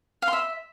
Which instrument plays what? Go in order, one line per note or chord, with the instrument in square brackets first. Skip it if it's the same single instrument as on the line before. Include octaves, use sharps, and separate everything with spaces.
[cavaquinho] F5
C6
E5